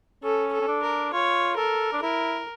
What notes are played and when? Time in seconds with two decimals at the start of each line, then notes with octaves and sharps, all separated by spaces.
0.23 C#4 A4
0.53 A4
0.61 C#4
0.68 D4
0.83 A#4
1.13 F4 C#5
1.57 A4 A#4
1.93 D4
2.02 E4 A#4